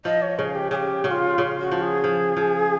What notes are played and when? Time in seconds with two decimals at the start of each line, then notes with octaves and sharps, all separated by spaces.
0.05 F3 D#5
0.22 C#5
0.38 C#3 G#4
0.55 G4
0.71 C#3 G#4
0.75 G4
1.04 C#3 F#4
1.10 F4
1.38 C#3
1.60 F#4
1.71 F3
1.82 G#4
2.04 F3
2.37 F3